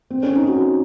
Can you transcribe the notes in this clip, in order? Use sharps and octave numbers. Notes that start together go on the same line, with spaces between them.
C4
C#4
D#4
F#4